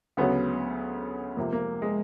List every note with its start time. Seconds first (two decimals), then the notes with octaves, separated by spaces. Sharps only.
0.17 D2 C#3 F#3 B3
1.37 F2 C3 F3 A#3
1.52 A#3
1.82 G#3